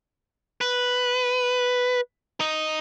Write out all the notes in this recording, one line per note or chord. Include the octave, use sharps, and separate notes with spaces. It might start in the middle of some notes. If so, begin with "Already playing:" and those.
B4
D#4 D#5